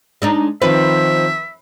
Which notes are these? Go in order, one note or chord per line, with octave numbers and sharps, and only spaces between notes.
G#3 D4 D#4
D#3 F3 C4 B4 E5